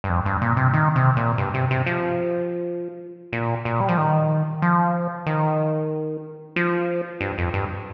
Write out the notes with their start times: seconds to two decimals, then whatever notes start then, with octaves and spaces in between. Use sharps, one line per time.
0.04 G2
0.09 F2
0.25 G2
0.42 A#2
0.57 C3
0.74 D#3
0.96 C3
1.17 A#2
1.38 G2
1.54 C3
1.71 C3
1.86 F3
3.32 A#2
3.65 A#2
3.80 G3
3.88 F3
3.98 D#3
4.62 F3
5.26 D#3
6.56 F3
7.21 G2
7.38 F2
7.54 G2